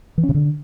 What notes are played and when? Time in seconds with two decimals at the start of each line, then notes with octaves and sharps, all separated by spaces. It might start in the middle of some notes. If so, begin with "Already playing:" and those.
0.18 E3
0.23 C#4
0.29 C3
0.35 D3